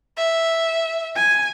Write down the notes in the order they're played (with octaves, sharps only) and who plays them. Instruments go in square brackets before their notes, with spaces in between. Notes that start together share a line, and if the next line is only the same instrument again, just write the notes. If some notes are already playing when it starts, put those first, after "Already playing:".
[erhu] E5
[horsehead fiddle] G#5